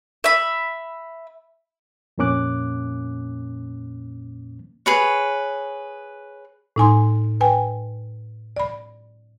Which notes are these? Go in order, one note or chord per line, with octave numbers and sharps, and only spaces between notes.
E5 B5
F2 A#2 A#3 C#4 D6 F#6
G#4 B4 C#5
A2 D#4 G#5 C6
B4 G5 G#5
D5 B5